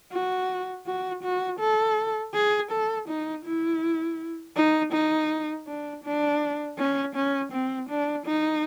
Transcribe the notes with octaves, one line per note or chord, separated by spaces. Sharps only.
F#4
F#4
F#4
A4
G#4
A4
D#4
E4
D#4
D#4
D4
D4
C#4
C#4
C4
D4
D#4